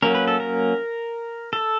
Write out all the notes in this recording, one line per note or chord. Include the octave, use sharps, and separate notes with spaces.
F#3 A#3 C#4 A#4
B4
A4
A#4
A4